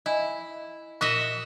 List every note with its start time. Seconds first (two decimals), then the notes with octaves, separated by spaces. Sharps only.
0.06 E4 D#5 G#5
1.01 A#2 F#4 D#5 E5